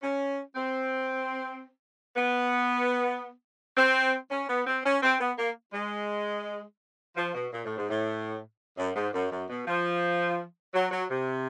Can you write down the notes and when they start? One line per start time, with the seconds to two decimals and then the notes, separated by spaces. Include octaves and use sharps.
0.03 C#4
0.56 C4
2.17 B3
3.77 C4
4.31 C#4
4.49 B3
4.66 C4
4.85 C#4
5.02 C4
5.20 B3
5.38 A#3
5.73 G#3
7.17 F3
7.34 B2
7.52 A#2
7.64 A2
7.77 G#2
7.89 A2
8.77 F#2
8.95 G#2
9.13 F#2
9.31 F#2
9.49 B2
9.67 F3
10.74 F#3
10.92 F#3
11.10 C3